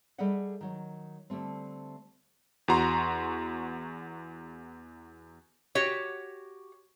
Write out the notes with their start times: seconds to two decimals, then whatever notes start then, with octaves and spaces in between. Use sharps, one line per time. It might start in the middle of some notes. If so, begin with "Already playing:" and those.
0.18 G3 G#4 A4 D#5 E5 F#5
0.61 D#3 F#3
1.30 D3 G3 A3 C4
2.68 E2 F#4 A#5 C6
5.75 F#4 G4 C#5